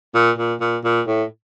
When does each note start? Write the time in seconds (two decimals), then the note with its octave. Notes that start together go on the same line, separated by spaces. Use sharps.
0.15 A#2
0.38 A#2
0.61 A#2
0.84 A#2
1.07 A2